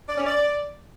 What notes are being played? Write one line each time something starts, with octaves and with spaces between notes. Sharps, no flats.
D5
C#4
D5